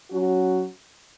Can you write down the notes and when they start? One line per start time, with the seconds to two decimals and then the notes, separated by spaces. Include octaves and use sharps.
0.10 F#3 C#4 F#4